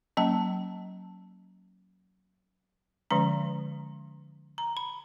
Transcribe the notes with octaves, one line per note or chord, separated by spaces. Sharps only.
F#3 A#3 C#4 A5
D3 F3 G#3 C#4 A#5
A#5
B5